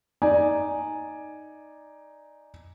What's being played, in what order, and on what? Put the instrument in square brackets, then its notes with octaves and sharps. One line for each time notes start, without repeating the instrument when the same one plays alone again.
[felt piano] D#4 D5 G#5